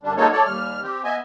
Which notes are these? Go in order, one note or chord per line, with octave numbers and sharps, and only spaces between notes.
F#2 D3 G3 D4
F#3 G#3 A#3 D#4 A4 C#5
A3 A4 C#5 D5
D#2 G3 F6
C4 G4
B3 D#5 E5 G#5